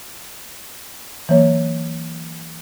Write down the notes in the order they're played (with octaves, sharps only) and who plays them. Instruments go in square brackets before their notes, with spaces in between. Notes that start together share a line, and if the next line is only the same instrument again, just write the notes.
[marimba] E3 F#3 A#3 C#5